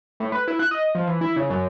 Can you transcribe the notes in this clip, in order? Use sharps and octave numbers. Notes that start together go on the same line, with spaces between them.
A2
B4
E4
F#6
D#5
F3
E3
E4
C#3
F#2